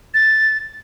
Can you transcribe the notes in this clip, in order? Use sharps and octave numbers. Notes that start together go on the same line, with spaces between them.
A6